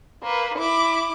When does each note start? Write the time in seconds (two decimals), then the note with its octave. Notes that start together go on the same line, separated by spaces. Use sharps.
0.23 A#3 B4
0.58 E4 D6